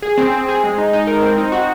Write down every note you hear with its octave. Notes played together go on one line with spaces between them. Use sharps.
G#4
C4
C4
G#4
G#3
D#4
D#4
A#4
C4
D#4
F#4